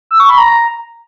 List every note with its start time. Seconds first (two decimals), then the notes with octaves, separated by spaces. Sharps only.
0.11 E6
0.20 C#6
0.29 B5
0.38 A#5